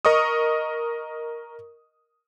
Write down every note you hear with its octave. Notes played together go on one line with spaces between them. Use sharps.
A#4 D#5 C#6 D#6